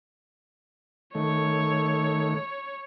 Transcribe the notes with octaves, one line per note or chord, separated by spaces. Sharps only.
D#3 A3 C#5